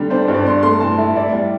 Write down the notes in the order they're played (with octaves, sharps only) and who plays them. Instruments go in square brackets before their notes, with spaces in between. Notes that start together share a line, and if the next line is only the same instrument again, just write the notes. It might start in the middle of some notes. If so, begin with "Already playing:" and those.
Already playing: [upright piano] D3 G3
D4 C5
C5
G2
D5
D4 C6
A3 C6
A2 A5
A2 E5
E4 D5
G3